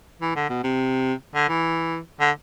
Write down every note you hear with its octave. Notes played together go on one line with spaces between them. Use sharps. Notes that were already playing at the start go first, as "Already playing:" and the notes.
E3
D3
B2
C3
D3
E3
D3